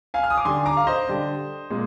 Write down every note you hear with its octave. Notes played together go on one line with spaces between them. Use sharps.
F5 G#5
F6
D#6
D6
D3 G3 D4 G#5 C6
A#5 D6
F5
C5 D#5
D3 G3 D4
A#2 G#3